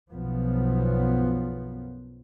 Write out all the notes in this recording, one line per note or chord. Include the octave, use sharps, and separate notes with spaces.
B1 F#2 F3 B3